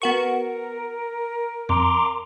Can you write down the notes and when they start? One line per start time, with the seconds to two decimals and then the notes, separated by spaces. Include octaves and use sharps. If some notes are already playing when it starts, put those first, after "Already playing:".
0.02 B3 F#4 A#4 C#6
1.69 F2 A#5 C6 D6